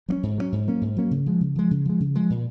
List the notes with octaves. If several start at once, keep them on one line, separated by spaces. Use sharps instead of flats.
F#3 A#3 C#4
G#2
F#3 A#3 C#4
G#2
F#3 A#3 C#4
G#2
F#3 A#3 C#4
C#3
F3 G#3
C#3
F3 G#3
C#3
F3 G#3
C#3
F3 G#3
A#2